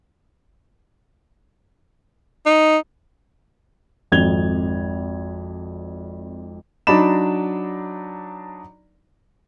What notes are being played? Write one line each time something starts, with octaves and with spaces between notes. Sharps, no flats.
D#4
G#1 F2 G#6 F7 G7
F#3 D4 D#4 D5 B5 E7